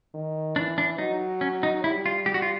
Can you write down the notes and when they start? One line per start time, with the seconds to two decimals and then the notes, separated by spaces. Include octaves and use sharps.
0.14 D#3
0.56 E3 D4
0.78 D4
0.98 F#3 D#4
1.41 C#4
1.63 D#4
1.84 G3 E4
2.06 F4
2.26 G3 G4
2.34 F#4
2.42 F4